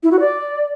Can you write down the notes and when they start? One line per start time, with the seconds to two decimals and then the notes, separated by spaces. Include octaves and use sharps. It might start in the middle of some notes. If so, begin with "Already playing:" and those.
0.03 E4
0.12 F#4
0.20 D5